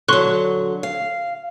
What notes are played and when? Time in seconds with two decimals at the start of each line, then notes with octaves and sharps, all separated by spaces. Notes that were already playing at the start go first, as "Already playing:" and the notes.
0.08 D3 F#3 C6 C#6 F#6
0.83 F5